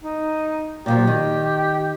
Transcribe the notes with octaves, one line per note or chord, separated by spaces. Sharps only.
D#4
A#2 F3 F#3 G4
D#3